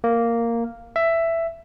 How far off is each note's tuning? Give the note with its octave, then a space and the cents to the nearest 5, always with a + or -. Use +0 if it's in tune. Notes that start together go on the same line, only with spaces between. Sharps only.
A#3 -5
E5 +10